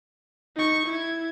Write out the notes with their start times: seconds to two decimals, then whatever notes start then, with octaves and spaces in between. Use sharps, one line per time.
0.56 D#4 C#6
0.86 E4 G#6